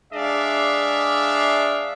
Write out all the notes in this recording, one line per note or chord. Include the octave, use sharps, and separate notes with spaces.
G#3 D4 G#4 D5 E5 F5